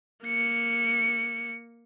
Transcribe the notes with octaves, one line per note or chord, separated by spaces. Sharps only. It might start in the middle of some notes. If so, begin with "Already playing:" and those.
A#3 C#7